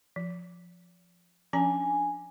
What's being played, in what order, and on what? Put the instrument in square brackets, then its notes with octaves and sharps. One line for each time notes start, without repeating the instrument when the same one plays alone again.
[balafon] F3
[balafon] F3 C#4 A#5 [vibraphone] D4 G#5